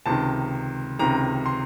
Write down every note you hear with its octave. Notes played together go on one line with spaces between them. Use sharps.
C#2 C3 D#3 A5
C#2 C3 D#3 A#5
C6